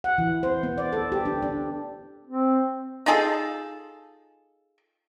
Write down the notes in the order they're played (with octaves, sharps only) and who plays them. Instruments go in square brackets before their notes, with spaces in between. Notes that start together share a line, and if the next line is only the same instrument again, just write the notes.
[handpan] F#5
E3
C5
B3
D5
A4
G4
D4
D4
[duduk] C4
[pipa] D#4 F4 G#4 A4